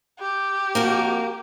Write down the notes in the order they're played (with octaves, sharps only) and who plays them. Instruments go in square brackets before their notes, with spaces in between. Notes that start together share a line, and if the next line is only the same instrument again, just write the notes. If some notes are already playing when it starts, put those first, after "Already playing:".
[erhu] G4
[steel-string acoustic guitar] F2 F#4 A#4 [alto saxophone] A#3